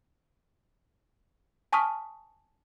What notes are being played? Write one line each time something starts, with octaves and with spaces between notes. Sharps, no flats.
G#5 A5 C#6 D#6 F6 B6